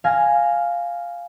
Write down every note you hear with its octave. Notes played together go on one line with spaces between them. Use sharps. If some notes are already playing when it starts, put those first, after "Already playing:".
F5 G#5 F6 A#6